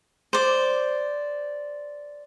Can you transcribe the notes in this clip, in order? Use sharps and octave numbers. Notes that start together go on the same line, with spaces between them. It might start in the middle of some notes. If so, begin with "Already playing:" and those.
C5 D5